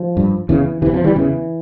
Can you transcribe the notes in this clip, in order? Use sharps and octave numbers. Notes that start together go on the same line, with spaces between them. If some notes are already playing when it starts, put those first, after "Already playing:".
Already playing: F3
G2
E2 C#3 E3
E2 C3 E3
F3
E3 G3
E2 C#3 E3